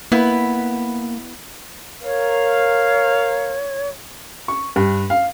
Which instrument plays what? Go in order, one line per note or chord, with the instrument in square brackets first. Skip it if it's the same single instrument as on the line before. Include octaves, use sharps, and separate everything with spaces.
[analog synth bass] A#3 [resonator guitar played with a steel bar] B3 E4 B4
[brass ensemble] A#4 F5 [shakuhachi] C#5
[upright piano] C#6
G2
F5